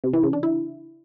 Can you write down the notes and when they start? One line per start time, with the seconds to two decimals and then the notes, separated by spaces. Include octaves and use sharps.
0.04 C3
0.13 E3
0.23 C#3
0.33 D4
0.43 E4